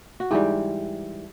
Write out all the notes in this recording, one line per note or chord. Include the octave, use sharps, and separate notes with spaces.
F#4
G#2 E3 G3 G4